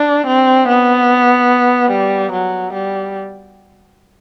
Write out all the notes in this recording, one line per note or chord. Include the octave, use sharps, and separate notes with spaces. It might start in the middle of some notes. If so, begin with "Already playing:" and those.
Already playing: D4
C4
B3
G3
F#3
G3